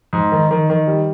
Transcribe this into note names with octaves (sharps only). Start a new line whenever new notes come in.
G#2
D#3
D#3
D#3
G3